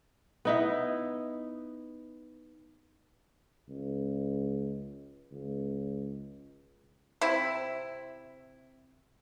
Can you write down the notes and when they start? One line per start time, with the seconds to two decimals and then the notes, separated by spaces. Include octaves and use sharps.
0.45 B3 D#4 E4
3.69 C#2
5.31 C#2
7.21 C3 C4 E4